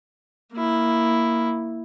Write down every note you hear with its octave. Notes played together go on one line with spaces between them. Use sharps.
A#3 E4